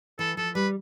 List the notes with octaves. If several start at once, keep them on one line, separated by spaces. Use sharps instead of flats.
E3 A4
F3 A4
G3 B4